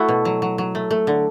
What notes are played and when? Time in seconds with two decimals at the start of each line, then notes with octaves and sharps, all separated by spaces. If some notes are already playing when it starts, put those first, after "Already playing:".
Already playing: A3 E4 F#4
0.09 B2
0.25 F#3
0.42 F#3
0.58 F#3
0.75 A3
0.91 A3
1.07 D3